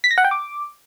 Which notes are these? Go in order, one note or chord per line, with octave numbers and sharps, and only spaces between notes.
B6
A#6
F#5
G5
D6